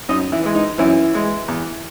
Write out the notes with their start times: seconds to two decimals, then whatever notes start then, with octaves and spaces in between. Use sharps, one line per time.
0.09 F#2 D#4 D#5
0.32 E3 E4
0.44 E3 G#3
0.55 D#4
0.78 F#2 E3 E4
1.14 E3 G#3
1.48 E2